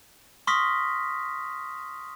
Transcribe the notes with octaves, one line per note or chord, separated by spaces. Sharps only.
C6 C#6 D#6 F6 A#6 B6